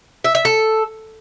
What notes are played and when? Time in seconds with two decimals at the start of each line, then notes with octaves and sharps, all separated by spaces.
0.24 E5
0.35 E5
0.45 A4